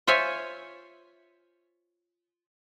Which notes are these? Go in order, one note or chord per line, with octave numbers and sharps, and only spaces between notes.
F4 C5 C#5 E5 G#5